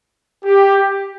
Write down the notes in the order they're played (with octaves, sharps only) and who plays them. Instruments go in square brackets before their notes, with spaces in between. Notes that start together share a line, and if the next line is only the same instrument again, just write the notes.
[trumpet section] G4